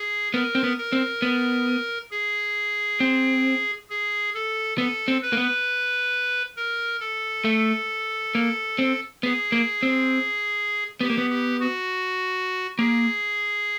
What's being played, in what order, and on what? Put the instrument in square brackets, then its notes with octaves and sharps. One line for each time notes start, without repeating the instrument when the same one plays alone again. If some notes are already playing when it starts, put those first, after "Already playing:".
Already playing: [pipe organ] G#4
[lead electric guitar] B3 [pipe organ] A#4
[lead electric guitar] C4
B3
[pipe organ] A#4
[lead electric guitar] C4
B3
[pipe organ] G#4
[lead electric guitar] C4
[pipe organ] G#4
A4
[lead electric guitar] B3 [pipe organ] A4
[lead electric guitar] C4
[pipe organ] B4
[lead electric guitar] A#3
B3
[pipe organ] A#4
A4
[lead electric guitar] A3
A#3
C4
[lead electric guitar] B3 [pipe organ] G#4
[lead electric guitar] A#3
C4
[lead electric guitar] B3 [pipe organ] G4
[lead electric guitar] A#3
B3
[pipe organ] G4
F#4
[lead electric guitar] A#3 [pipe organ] G#4